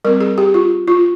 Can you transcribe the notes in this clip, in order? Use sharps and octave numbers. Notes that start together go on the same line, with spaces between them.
G3 C4 A#4
G#4
G4
F4
F4